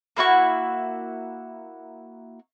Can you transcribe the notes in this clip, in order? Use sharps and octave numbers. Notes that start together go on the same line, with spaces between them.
A#3 E4 F#4 C#6